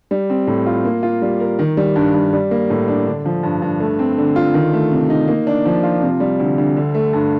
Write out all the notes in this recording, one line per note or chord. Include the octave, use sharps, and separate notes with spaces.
G3
C4
A2
F4
A#3
F4
G3
A#4
D#3
G3
G2
G2
G3
A#3
A2
D4
D3
F3
G2
G2
A3
C4
D3
F4
D#3
A3
C3
D#4
A#3
D4
F3
F4
C3
G3
D2
D2
D3
A3
G2